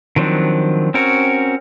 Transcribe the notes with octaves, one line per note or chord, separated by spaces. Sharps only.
D#3 F3 F#3 C4 D4
C4 C#4 F#4 A#4